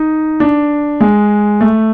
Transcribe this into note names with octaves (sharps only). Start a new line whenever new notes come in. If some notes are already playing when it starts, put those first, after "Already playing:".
Already playing: D#4
D4
G#3
A3